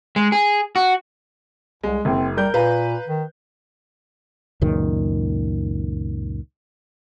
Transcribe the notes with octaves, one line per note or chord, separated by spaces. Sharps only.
G#3
G#4
F#4
C2 G#3
F#1 C4
G3 A#4 G6
A#2 B4 F5 A#5
D#3
C#2 F#2 A#2 D#3